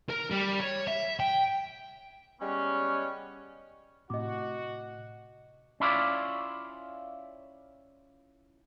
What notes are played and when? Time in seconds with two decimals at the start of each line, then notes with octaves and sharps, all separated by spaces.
0.10 A#4
0.31 G3
0.60 C#5
0.88 E5
1.20 G5
2.41 G3 G#3 B3 C#4
4.10 A2 C3 F#4 D#5 D6
5.80 C#4 E4 F4 D5